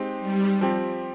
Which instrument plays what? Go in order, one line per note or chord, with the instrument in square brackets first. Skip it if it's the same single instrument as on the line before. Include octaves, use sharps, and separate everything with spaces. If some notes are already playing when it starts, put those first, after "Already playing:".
Already playing: [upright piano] G#3 C4 D#4 G4
[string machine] G3
[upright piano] F3 C4 G4